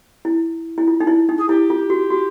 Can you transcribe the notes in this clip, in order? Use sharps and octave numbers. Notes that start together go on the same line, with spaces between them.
E4
E4
F4
D#4
E4
D#4
G#4
E4 G4
F4
F#4
F#4